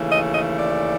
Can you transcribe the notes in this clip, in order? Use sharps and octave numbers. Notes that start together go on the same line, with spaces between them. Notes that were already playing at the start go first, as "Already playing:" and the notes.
Already playing: D#2 C#3 E3 A3
D#5
D#5
D5